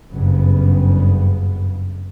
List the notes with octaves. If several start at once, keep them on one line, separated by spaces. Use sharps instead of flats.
F#1 G2 C#3 B3